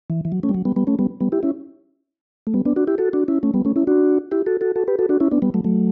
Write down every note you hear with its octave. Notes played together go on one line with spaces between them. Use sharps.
E3
E3
F#3
A3 C#4
G3
F#3
G3 B3
G3 B3
A3 C#4
G3 B3
G3 B3
E4 G4
C#4 E4
A3
G3 B3
B3 D4
D4 F#4
E4 G4
F#4 A4
D4 F#4
C#4 E4
A3 C#4
G3 B3
A3 C#4
C#4 E4
D4 F#4
E4 G4
F#4 A4
F#4 A4
F#4 A4
G4 B4
F#4 A4
D4 F#4
C#4 E4
B3 D4
G3 B3
F#3 A3
F#3 A3